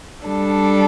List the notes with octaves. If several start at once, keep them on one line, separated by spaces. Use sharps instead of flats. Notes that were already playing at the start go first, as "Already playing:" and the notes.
G3 D4 A4